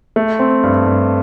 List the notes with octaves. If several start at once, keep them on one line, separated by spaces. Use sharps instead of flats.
A3
C4
G2
G2